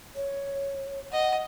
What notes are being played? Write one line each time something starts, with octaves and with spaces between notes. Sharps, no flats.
C#5
D#5 F#5